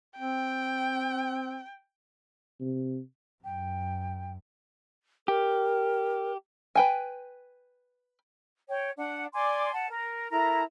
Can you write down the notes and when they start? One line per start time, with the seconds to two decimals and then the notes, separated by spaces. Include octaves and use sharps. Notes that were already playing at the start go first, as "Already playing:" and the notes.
0.18 C4 G5
2.60 C3
3.44 F#2 G5
5.28 G4 A#4
6.75 B4 G5 G#5
8.68 C#5 G5
8.97 D4 F#5
9.34 D5 G#5 C6 D6
9.73 F#5 A5
9.90 A#4
10.31 E4 A4 A#4 A#5